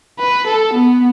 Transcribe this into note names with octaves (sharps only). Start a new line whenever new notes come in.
B4
A4
B3